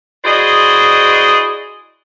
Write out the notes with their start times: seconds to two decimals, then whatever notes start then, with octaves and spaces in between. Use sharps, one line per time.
0.24 E4 F#4 G#4 C5 D5 D#5